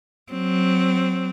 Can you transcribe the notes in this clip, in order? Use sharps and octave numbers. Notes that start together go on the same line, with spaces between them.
F#3 C4